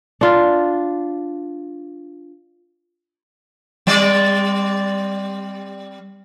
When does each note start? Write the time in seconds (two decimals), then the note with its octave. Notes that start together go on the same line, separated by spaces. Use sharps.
0.21 D4 F4
3.87 G3 C4 D5